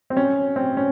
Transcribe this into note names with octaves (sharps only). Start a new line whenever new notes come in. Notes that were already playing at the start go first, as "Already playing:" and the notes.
C4
C#4
C4
C#4